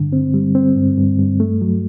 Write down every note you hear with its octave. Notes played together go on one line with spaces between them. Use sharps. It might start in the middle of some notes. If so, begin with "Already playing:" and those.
Already playing: G2 D3
C4
G3
C4
G2
G2
G2
A3
F#3